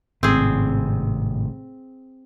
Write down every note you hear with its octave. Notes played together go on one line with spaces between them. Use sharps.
G#1 A2 C3 C4 G#4